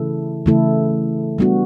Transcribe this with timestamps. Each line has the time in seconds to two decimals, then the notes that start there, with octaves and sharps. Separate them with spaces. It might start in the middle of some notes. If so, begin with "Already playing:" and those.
Already playing: C#3 E3 A3 E4 A4
0.46 C#3 E3 A3 E4 A4
1.38 G3 B3 D4 F#4